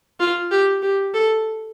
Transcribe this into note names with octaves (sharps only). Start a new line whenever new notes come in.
F4
G4
G4
A4